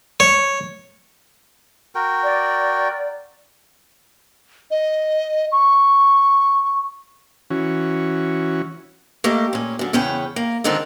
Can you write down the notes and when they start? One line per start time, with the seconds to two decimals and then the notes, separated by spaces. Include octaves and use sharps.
0.20 C#5
1.95 F#4 A#4 G5
2.23 D5
4.71 D#5
5.52 C#6
7.50 E3 C#4 F#4
9.24 A3 A#3 G4 D#5 F5
9.53 A#2 C#4
9.79 F#2 D3
9.93 E2 C#3 C#4 B4 G5
10.36 A#3
10.64 G#2 D3 D#3 C4 D4 F4